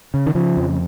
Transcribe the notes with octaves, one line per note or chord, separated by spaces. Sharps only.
C#3
D#3
C#3 F3
F2